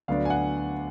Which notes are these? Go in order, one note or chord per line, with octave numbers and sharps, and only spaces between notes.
D2 D3 F#3 B3 D4 F5
G#5
F#5